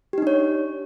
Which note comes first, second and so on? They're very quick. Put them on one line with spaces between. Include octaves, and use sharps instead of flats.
G4 D#4 D4 C#5